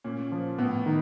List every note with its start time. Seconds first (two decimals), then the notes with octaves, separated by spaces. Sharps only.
0.04 A#2 C#4
0.32 F3
0.58 A2 B3
0.86 D#3